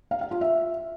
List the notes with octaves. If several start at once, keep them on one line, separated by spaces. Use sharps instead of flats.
F5
F5
F4
E5